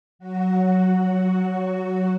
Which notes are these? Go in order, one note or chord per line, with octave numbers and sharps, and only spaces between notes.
F#3 F#4